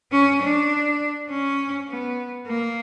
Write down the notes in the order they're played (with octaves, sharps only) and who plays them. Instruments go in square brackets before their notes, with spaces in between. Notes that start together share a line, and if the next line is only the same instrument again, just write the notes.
[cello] C#4
D4
C#4
B3
A#3